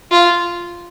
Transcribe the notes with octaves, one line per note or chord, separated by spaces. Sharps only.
F4